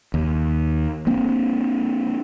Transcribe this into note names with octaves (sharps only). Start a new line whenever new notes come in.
D#2
A#3 C4 D4